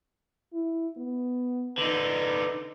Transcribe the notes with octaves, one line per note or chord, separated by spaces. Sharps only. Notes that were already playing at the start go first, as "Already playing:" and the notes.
E4
B3
D3 D#4 B4